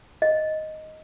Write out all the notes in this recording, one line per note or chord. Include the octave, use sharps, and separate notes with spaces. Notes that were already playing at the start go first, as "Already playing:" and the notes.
D#5